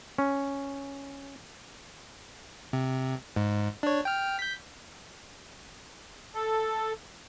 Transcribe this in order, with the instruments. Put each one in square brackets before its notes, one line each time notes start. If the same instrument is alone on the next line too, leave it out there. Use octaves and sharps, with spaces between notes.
[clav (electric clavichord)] C#4
[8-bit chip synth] C3
G#2
D4 C#5
G5 F6
G6 B6
[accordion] A4